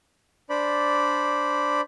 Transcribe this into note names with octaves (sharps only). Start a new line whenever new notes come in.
D4 C5 D5 B5